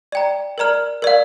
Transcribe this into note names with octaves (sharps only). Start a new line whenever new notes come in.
D5 G5 A#5
A#4 D5 A#5 F6
A#4 D5 F5